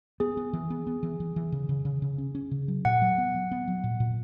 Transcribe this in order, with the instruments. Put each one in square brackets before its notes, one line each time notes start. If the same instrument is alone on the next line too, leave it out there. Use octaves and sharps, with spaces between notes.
[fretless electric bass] B3 [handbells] G#4
[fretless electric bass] B3
E3
B3
B3
E3
E3
E3
C#3
C#3
C#3
C#3
C#4
C#4
C#3
F#3
[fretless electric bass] A#2 [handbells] F#5
[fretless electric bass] F#3
B3
F#3
B3
F#3
A#2
A#2